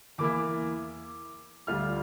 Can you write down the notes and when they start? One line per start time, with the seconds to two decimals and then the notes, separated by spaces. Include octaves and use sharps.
0.18 E2 E3 A#3 E4 D6
1.67 D2 D3 G3 D4 F4 F6